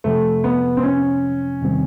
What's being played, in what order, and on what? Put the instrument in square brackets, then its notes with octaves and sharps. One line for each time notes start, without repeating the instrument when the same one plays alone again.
[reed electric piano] F2 C3 F3 [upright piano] A3
[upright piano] B3
C4
C#4
[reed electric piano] E2 C3 D#3 G3 C4